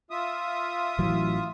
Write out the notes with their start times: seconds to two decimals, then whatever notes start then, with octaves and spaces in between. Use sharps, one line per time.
0.11 F4 E5 D#6
0.98 A1 E3 F#3